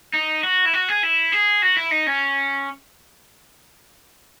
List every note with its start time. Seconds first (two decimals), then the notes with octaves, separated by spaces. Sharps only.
0.13 D#4
0.43 F#4
0.65 E4
0.73 F#4
0.89 G#4
1.03 E4
1.32 G#4
1.62 F#4
1.77 E4
1.91 D#4
2.07 C#4